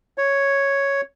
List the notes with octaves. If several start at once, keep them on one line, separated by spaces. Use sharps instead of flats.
C#5